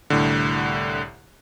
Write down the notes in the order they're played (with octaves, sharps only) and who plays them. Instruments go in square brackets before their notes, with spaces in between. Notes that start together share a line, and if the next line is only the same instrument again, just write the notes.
[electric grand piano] C2 A2 D3